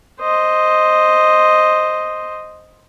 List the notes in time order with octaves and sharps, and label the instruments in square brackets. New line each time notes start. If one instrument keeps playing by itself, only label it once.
[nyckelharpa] C5 D#5